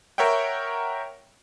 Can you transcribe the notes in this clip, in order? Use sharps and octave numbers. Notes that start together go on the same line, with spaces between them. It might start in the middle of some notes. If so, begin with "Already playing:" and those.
A#4 C#5 E5 F#5 G5